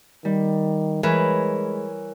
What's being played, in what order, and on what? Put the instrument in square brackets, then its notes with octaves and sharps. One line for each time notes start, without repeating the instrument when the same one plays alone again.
[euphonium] D#3 [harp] G3
[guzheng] E3 [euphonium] G#3 [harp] A#4 C#5 B5